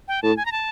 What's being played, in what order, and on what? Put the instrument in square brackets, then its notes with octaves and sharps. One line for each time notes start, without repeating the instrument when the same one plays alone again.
[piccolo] G5
[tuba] A2 [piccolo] A5
[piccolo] G#5
A#5
A5